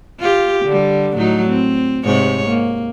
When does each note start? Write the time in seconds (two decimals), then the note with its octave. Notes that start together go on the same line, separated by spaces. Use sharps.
0.20 F4 G4
0.65 D3 G3
1.17 A2 F#3 D#4
1.49 C4
2.04 G#2 C3 C#5
2.48 A#3